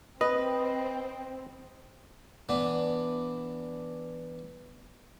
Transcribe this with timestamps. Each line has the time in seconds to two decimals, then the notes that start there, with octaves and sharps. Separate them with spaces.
0.21 C4 B4 D#5
2.49 E3 B3 D4